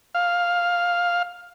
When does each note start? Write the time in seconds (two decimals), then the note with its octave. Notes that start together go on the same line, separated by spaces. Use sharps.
0.15 F5